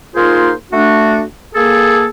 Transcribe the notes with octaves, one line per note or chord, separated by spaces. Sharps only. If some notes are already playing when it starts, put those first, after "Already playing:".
A#3 D#4 F4 G#4 A#4 C5
A3 D4 F#4
A#3 G#4 A4